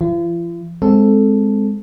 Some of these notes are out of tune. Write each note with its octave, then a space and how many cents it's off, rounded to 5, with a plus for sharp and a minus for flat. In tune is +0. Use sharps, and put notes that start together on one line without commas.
F3 -45 F4 -45
G#3 +0 C4 +0 A4 +0